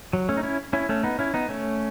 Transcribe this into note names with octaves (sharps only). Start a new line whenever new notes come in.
F#3
A3 C#4
D#4
C#4 E4
C#4 E4
A3 C#4
B3 D#4
C#4 E4
B3 D#4
A3 C#4